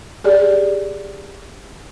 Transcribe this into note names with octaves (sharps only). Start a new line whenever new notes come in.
G4 G#4 D5